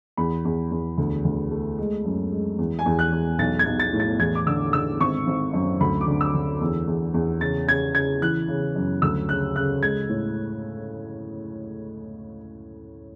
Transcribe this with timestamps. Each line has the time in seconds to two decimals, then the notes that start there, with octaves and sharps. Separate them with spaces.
0.17 E2 B5
0.45 E2
0.71 E2
0.98 D2
1.25 D2
1.51 A3
1.78 G#3
2.05 F#2
2.32 G#3
2.59 E2
2.79 G#5
2.86 E2
2.99 F#6
3.12 E2
3.39 B1 A6
3.59 G#6
3.66 B1
3.80 A6
3.93 A2
4.00 A6
4.19 E2 G#6
4.35 D6
4.47 D3 E6
4.73 D3 E6
5.00 G#1 C#6
5.27 G#1
5.53 F#2
5.80 D2 B5
6.01 D6
6.07 D3
6.21 E6
6.34 D3
6.61 E2
6.87 E2
7.14 E2
7.41 C#3 A6
7.67 C#3 G#6
7.95 C#3 G#6
8.22 E3 F#6
8.48 C#3
8.76 F#2
9.02 D2 E6
9.29 C#3 F#6
9.56 C#3 F#6
9.82 G#3 G#6
10.09 A2